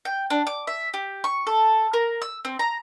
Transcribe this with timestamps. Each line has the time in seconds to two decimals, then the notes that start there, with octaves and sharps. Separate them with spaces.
0.05 G5
0.30 D4
0.47 D6
0.67 E5
0.94 G4
1.24 C#6
1.47 A4
1.93 A#4
2.22 E6
2.45 C4
2.59 A#5